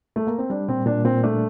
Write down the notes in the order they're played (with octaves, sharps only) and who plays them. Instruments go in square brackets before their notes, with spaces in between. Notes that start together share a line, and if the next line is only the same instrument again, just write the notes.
[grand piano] A3
A#3
C4
[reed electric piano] G3 [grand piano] D4
[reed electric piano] A#2 [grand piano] C4
[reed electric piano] A#2 [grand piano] D4
[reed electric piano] A#2 [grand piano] C4
[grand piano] A3 [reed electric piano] D4